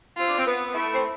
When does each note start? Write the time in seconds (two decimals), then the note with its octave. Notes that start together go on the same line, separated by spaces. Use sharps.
0.17 C4 F4
0.27 D4
0.37 C4
0.46 B3
0.73 A3 E4
0.94 C4